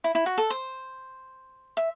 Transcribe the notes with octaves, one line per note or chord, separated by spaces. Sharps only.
E4
E4
F#4
A4
C5
E5